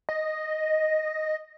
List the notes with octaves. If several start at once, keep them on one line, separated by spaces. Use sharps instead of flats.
D#5